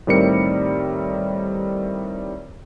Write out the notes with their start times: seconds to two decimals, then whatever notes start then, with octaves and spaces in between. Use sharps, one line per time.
0.07 A2 D#3 G3 C4 A#4 C#7